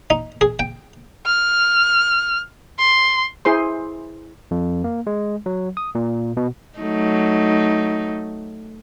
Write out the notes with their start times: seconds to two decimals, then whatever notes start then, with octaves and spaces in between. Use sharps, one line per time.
0.10 D#4
0.41 G#4
0.59 G5
1.26 F6
2.79 C6
3.45 E4 G#4 C5 C6
4.51 F2
4.84 A#3
5.07 G#3
5.46 F#3
5.77 D#6
5.95 A#2
6.37 B2
6.79 F#3 A3 D#4